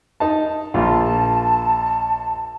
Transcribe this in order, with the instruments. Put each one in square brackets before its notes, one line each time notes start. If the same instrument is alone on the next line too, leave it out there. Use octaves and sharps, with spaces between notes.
[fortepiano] D#4 A5
[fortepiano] A#1 F4 [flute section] A5